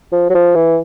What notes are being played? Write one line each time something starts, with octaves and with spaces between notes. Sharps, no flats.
F3
F#3
F3
E3